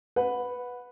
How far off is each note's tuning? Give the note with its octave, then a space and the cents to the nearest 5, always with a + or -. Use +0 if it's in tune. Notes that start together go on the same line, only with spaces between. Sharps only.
B4 +0 F#5 -20